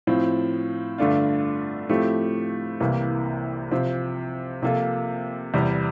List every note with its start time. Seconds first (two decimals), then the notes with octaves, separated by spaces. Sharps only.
0.07 A2 F3 C4
0.98 G2 D3 A3 D4 F4
1.89 A2 F3 A3 C4 G4
2.80 C2 C3 E3 A#3
3.71 C3 F3 C4
4.63 C3 F3 A#3 F4 A4
5.54 E2 C3 G3